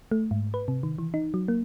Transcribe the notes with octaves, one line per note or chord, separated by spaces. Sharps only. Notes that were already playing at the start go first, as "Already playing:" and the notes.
A3
G#2
B4
C3
D#3
E3
D#4
F#3
A#3